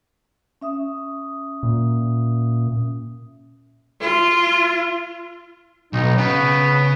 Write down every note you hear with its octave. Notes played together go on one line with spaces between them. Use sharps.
C#4 E5 D#6
A#2
F4
B1 D#4
C#3 B3